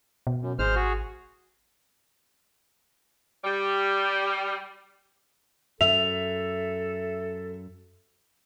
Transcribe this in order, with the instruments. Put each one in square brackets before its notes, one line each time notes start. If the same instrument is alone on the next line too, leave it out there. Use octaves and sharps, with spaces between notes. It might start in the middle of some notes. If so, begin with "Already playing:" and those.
[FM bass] B2
[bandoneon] F#2
[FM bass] G#1 [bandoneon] G#3 C5 F6
[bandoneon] F#4 G#4
[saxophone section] G3
[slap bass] F#2 [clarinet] A4 [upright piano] E5 [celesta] F7